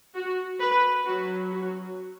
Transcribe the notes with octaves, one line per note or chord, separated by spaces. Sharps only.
F#4
B4
F#3 C#4 F#4
F#4